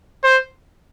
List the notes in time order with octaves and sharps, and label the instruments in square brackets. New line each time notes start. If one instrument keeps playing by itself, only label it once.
[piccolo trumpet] C5